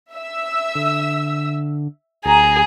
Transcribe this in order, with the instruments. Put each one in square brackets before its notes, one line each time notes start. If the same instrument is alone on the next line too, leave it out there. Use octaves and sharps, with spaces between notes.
[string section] E5 E6
[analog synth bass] D3
[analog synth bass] D2 [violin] G#4 [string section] A#5